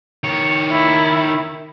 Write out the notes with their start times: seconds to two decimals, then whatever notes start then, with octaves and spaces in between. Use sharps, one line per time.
0.24 D#3 C#5
0.71 E4